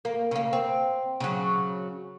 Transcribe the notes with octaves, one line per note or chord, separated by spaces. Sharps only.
A#3
C#3 A#3
C4
C#3 F#3